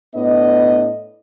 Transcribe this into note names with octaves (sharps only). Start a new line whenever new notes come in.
A2 B3 D4 D#5